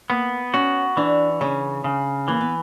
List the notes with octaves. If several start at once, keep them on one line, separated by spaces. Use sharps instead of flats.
A#3 B3
C#4 F#4
E3 D4
C#3 C#4
C#3
E3 A#3
B3